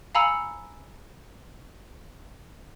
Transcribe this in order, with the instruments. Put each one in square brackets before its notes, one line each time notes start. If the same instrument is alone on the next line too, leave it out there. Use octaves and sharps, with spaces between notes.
[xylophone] F5 G#5 A#5 B5 E6 C#7